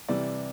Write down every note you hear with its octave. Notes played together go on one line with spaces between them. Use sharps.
C3 E3 G3 D5